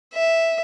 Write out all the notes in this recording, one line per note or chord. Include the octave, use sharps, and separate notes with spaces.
E5